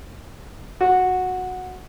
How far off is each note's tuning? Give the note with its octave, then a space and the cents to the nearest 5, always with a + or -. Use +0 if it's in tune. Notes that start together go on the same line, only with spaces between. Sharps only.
F#4 -10